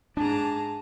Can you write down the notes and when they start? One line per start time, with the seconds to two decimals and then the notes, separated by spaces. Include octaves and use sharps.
0.17 G#2 D4 G#4 A5 A#5